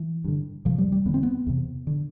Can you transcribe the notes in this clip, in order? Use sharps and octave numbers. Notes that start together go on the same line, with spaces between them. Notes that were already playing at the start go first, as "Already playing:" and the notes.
Already playing: E3
G2 D3
F2 C3 F3
G3
G3
E2 D3 B3
C4
B3
E2 C3
D3